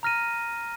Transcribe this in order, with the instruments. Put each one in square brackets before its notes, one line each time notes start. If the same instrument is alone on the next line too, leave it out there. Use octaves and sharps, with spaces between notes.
[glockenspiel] A#5 F6 A#6 D#7